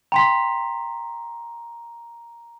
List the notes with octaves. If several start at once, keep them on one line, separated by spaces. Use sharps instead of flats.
G5 A#5 C6 B6